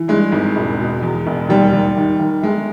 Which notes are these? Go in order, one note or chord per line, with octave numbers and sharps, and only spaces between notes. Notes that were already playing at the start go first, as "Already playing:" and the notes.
Already playing: E3
G2 G#3
G#1
E1
B2
E2
E1
D#2 G3
D#2
D#3
D#3
G1 G#3